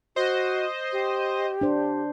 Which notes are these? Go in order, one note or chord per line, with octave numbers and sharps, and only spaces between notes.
F#4 C5 D#5
G4
D4 C5